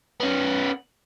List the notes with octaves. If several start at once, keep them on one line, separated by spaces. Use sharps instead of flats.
B3 C#4